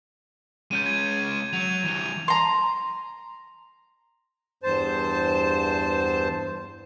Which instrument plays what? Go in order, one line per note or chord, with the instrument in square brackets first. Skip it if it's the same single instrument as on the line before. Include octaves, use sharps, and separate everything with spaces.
[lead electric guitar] G#3 C#4 [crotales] G6 D#7
[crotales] G#6
[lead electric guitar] F#3 [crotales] F7
[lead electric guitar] E3 G3
[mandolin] A#5 C6
[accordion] E2 G2 C5 A5